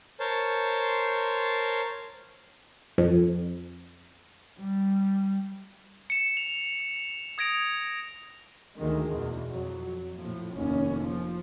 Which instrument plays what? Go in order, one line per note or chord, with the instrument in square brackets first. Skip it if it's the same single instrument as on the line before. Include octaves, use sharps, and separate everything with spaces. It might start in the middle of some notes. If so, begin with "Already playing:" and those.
[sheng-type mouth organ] A#4 C5 C#5 A5 C6
[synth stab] F2
[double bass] G3
[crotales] C#7 E7
F7
D#6 G#6 A#6 D7 F7
[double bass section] D2 D#3 G#3
E2 B2
F2 F#3
A2 F3
F1 D#2 A2 C#4
F3